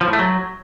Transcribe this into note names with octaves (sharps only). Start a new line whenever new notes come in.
F3
A2
A3
F#3